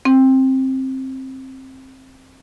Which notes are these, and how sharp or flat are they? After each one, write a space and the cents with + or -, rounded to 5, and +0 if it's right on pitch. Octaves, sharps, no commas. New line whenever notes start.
C4 +15